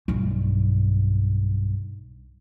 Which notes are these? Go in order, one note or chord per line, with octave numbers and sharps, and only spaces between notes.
B1 G2